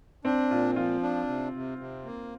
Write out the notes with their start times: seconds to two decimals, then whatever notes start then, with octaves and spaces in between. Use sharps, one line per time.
0.25 C4 D4
0.51 A#2 F4
0.76 F3 F4
1.02 D4
1.28 C3
1.54 C3
1.78 C3
2.05 A#3